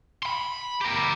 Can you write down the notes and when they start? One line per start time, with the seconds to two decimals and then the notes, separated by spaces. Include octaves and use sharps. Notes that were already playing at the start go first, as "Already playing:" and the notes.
0.23 B5 C6
0.81 G4 A#4